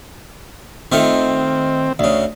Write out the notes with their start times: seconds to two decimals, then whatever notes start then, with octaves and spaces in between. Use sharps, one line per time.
0.92 D#3 A3 C4 F4
1.99 D2 C#3